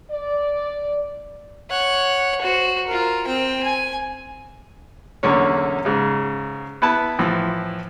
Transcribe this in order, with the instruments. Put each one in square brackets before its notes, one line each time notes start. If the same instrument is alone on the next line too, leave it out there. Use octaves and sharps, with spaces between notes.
[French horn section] D5
[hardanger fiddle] C#5 F#5
F#4 C5
F4 A#4
C4 G5
G#5
[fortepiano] B1 E2 D3 A#3 C#4 C#5
G#2 C#3
B3 E4 B4 A5
A2 E3 F3